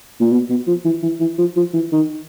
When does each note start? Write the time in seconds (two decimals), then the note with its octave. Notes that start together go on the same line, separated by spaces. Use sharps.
0.20 A#2
0.32 B2
0.50 B2
0.67 F3
0.85 E3
1.03 E3
1.20 E3
1.38 F3
1.56 F3
1.74 E3
1.92 D#3